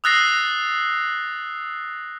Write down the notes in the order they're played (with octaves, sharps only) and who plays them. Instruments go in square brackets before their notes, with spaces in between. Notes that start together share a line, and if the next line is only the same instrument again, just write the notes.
[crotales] D#6 E6 F#6 A6 A#6 C7